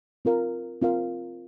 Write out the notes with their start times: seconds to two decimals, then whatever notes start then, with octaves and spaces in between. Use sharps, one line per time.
0.25 C4 F4 A#4 F5
0.81 C4 F4 A#4 F5